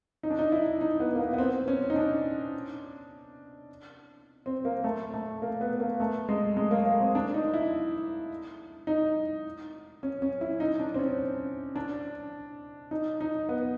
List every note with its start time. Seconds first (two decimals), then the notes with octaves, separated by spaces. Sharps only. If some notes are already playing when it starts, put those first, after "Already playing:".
0.23 D#4
0.30 D4
0.39 D#4
0.52 E4
0.81 D#4
1.00 B3
1.15 A#3
1.20 B3
1.33 B3
1.38 C4
1.68 C#4
1.90 D#4
1.96 D4
4.46 C4
4.65 A#3
4.84 A3
5.14 A3
5.42 A#3
5.61 B3
5.80 A#3
6.00 A3
6.29 G#3
6.57 G#3
6.71 A#3
6.86 A#3
7.00 C4
7.15 D4
7.34 D#4
7.54 E4
8.87 D#4
10.03 C#4
10.22 C#4
10.41 E4
10.60 D#4
10.80 D4
10.94 C4
10.99 C#4
11.76 D4
12.91 D#4
13.21 D#4
13.49 B3